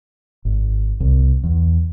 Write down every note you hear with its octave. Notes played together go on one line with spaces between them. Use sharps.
G#1
C2
E2